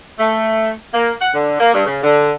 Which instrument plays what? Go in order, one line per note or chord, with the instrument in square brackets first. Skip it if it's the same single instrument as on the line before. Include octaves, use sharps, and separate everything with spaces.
[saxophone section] A3
A#3
F#5
D3
A#3
G2
C#3
D3